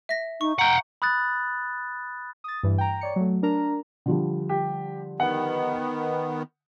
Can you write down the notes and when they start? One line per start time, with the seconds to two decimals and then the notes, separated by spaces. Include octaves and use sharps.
0.09 E5 A#6
0.41 D#4 C#6
0.59 F#5 G5 A#5
1.02 B5 D#6 F#6 A6
2.44 D#6 A6
2.63 G2 E3
2.78 G5 A#5
3.01 C#5 D5 C#7
3.16 F#3 A3
3.43 D4 A#4 A#5
4.06 D3 F3 G3
4.49 G4
5.20 D#3 B3 F#5